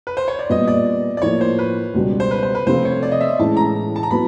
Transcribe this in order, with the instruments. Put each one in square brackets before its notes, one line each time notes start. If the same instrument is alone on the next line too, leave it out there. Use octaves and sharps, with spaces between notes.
[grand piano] B4
C5
C#5
D5
[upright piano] A#2 G3 B3 [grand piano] D#5
[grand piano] D5
D5
[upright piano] A2 F3 A#3 [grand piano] C#5
[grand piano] C5
B4
[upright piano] C#2 B2 G3
[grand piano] C5
B4
C5
B4
[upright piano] C3 F3 A3 C4 F4 [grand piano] C5
[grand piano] C#5
D5
D#5
E5
[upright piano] A2 E3 G#3 C#4 E4 [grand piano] A5
[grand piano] A#5
A5
A#5
[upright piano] A2 F#3 B3 [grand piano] B5